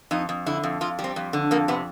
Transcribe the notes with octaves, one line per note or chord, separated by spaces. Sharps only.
F2 D#4
F2
D3 E4
F2
F2 F4
G3
C4
F2
D3
F2 A#3
C3 B3